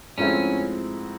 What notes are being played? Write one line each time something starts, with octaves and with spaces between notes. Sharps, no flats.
G#2 F3 A3 C4 C#4 E4